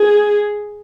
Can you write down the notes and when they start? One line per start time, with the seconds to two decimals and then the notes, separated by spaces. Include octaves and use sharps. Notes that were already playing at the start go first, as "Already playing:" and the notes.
Already playing: G#4